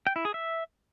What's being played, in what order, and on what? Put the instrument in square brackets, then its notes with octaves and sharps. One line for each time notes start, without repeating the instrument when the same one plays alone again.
[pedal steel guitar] G5
E4
G#4
E5